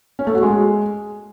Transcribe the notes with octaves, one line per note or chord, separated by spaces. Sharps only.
C#4
A3
F#4
G#3